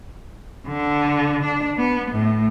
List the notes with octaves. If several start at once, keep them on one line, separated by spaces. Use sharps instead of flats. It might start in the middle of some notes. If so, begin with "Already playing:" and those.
D3
D4
B3
A2